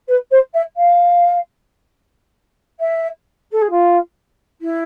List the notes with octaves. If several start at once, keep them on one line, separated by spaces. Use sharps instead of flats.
B4
C5
E5
F5
E5
A4
G#4
F4
E4